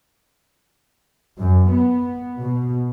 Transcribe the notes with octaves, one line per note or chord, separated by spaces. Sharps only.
F#2
B3
B2